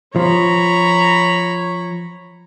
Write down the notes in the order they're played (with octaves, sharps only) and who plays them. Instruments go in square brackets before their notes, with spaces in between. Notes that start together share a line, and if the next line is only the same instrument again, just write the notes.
[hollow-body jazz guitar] F3 [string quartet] C#5 A#5 B5